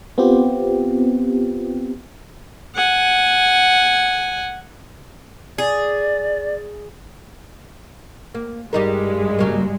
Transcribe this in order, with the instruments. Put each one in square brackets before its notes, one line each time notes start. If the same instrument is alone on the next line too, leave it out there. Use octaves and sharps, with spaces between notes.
[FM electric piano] B3 C4 F4 G4
[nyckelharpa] F#5 G#5
[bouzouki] G#4 [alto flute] D5
[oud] A#3
[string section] G2 G#3 [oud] G3 D#4 A#4
[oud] C#3 F#3 A#3